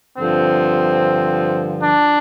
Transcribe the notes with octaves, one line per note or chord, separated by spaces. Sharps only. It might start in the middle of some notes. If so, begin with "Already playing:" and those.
G2 D3 F3 C4
D4